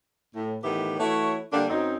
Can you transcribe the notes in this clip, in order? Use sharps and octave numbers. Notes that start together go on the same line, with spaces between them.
A2
A2 D#3 E3 B3 E4 G4
E3 A3 E4 F#4 C#5
D3 G3 A#3 D4
F#2 C4 D#4